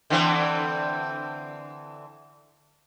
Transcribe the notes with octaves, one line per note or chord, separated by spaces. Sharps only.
D3 E3 C4